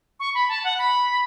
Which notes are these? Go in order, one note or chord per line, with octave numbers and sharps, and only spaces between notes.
C#6
B5
A5
F#5
B5